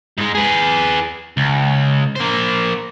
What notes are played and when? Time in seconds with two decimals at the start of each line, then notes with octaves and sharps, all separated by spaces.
0.18 G#2 G#3
0.35 G#4 B4
1.37 C#2
2.16 A#3 C5